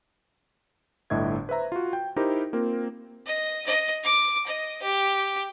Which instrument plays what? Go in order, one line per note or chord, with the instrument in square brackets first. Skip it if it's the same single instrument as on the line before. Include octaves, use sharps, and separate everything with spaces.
[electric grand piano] G1 A2 D4 D#5 E5 G#6
B4 C5 E5 A#5
F4 F#4
G5
D#4 E4 G4 A#4 C5
A#3 C4 F4 A#4
[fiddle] D#5
D#5
D6
D#5
G4